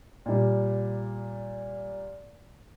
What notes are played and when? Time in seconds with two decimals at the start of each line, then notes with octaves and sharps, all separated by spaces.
0.26 A#2 G3